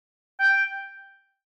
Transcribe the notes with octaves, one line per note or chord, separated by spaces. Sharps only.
G5